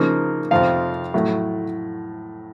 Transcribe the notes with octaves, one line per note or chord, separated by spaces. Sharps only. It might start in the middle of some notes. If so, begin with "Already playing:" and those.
Already playing: C#3 F3 A#3 D#4
F2 C3 F3 F5
A2 F#3 A3